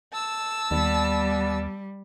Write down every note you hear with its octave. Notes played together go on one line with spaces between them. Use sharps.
A5 E6
D#2 G3 B3 D5